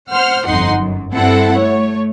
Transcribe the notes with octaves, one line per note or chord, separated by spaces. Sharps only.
C5 F#5 C6 F6
G1 F2 D#4 F#5 C6
F#2
G2 C4 E4 A4 F#5
A3 C#5